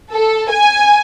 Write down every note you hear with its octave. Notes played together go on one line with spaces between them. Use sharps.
A4
G#5